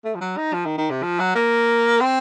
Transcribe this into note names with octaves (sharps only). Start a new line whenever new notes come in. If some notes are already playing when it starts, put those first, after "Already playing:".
A3
F3
F#3
D#4
F3
D#3
D#3
C3
F3
F#3
A#3
C4